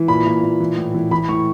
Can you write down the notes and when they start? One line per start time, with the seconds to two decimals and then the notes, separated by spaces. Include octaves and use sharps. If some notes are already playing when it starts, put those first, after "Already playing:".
Already playing: E3
0.08 A#2 B5
0.26 A#2
0.43 A#2
0.60 E3
0.77 A2
0.94 E3
1.11 E3 B5
1.29 A2 C#6